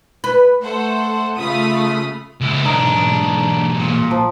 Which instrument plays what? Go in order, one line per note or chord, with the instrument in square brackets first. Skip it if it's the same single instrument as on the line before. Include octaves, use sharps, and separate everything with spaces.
[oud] B4
[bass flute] A3 [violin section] A4 C5 F#5
[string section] C#3 A3 [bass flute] F4 [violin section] F5 B5 D#6
[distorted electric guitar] C#2 E4
[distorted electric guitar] B1 G#2 [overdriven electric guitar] D4 [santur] D#4
[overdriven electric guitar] A#2
[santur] F3